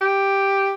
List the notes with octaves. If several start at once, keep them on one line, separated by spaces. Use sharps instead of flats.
G4